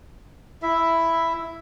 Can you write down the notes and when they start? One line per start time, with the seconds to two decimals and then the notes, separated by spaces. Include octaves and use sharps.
0.62 E4 E5